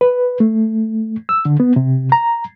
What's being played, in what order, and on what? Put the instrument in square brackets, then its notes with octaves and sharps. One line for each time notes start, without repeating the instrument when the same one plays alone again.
[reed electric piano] B4
A3
E6
D3
B3
C3
A#5